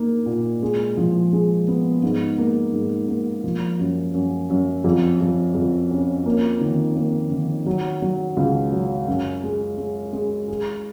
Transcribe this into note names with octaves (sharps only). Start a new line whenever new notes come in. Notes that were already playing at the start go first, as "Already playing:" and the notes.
Already playing: A#3 D#4
A#2
G#3
F3
G#3
B3
G#2
A#3
G#2
A#3
F3
F#2
F#2
F#2
F2
F2
F2
C#4
A#3
D#3
A#3
D#3
F#3
F#3
C#2
F#3
F#2
G#3
G#3
G#3
G#4